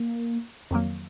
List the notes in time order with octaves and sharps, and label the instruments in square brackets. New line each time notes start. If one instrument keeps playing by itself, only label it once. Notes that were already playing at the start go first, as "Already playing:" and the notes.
Already playing: [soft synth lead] A#3
[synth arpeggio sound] F2 D#3 F#3 A#3